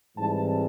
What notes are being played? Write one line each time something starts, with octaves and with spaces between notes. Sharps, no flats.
G#2 E3 G3 C4 A5